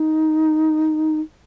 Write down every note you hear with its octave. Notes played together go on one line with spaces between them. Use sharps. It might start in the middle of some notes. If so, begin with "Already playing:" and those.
Already playing: D#4